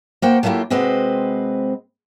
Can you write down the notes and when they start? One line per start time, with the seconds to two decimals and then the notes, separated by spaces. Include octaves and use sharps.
0.22 A#3 F#4 C5 F#5 G5
0.43 F#3 A3 A#3 E4 F4 G4
0.70 C3 G#3 C4 F#4 B4 D#5